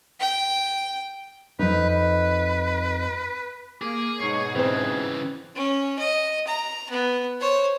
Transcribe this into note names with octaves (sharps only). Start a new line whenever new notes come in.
G5
F2 D#4 B4
B4
A#3 G#4 D6
G#2 B2 D#4 C#5 C7
C#3 E3 C4 G#4 C5
C#4
D#5
A#5
B3
C5 C#5